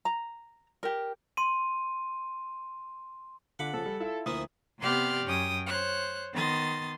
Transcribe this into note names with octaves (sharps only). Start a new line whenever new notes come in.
A#5
G4 A#4
C6 D#7
D3 F4 F#5 B5 D6
C#3 F3 A4
G3
E4 F4 A4 E5
D2 F3 A#3 E4 D#6
C3 B3 G4 D5 C6 F6
F#2 C#4 G5 D#6
C5 C#5 F#6
D#3 B3 C6 D#6 A6